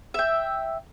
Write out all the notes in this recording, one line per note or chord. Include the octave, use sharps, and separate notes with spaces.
E5 G5